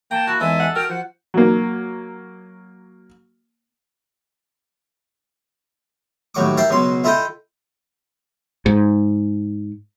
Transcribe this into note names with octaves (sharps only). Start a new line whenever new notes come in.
A#3 G5 A5 A#5
E4 F#4
E2 G#3 D#4 A4 E5 G#5
F#5
F#4 A#4 G5 D#6 F6
F3 F#5
F#3 A#3
D#2 A2 F#3 C#6 D6
A#4 E5 F5 G5 A5
C#2 B2 F#3 C6
E4 F4 A4 D#5 G5
G#2